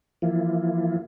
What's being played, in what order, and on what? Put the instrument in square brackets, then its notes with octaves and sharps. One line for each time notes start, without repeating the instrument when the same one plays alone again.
[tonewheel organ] E3 F3 A#3 E4 F4